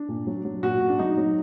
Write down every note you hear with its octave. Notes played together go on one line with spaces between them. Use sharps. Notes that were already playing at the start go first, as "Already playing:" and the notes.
Already playing: D4
A#2
F#3
F#3
A#2 F#4
A#2
D4
F#3 D#4
F#3